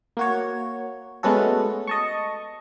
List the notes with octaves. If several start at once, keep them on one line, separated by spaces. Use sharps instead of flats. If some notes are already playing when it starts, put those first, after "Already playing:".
A#3 F#4 C#5
G#3 A3 B3 C#4 F#4 A4
D#5 A5 C#6